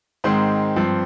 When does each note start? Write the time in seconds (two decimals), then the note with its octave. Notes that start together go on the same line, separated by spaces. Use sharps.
0.24 G#2 D#3 G#3 C4 C5 C6
0.76 G2 F3 C4